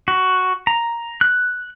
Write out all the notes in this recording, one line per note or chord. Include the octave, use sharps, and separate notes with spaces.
F#4
A#5
F#6